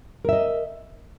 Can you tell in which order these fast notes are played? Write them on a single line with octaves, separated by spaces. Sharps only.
A#4 E5 D#5